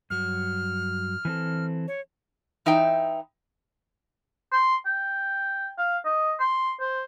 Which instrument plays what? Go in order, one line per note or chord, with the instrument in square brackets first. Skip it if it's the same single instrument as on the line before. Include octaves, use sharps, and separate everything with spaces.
[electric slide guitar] G2 F#3 [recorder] F6
[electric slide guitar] E3 C4 A4
[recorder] C#5
[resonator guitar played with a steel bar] E3 D#4 E5 G5
[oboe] C6
G5
F5
D#5
C6
C5